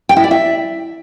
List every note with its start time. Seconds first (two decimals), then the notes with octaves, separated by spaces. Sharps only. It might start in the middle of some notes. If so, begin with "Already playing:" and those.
0.09 G5
0.16 E4
0.24 D5
0.31 E5